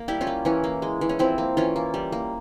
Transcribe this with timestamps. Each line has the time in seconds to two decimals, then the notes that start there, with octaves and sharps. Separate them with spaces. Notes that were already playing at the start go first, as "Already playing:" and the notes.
Already playing: A#3
0.08 G3 E4 G4
0.21 C#4 F4
0.27 A#3
0.45 E3 C#4
0.64 A#3
0.82 G#3
1.01 E3
1.09 C#4
1.19 F3 C4 E4
1.38 A#3
1.57 E3 C#4 F4
1.76 A#3
1.94 G3
2.12 A#3